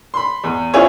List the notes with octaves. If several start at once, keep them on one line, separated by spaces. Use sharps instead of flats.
B5 C6
E2
C#4 E4 F4 G#4 C5 C#5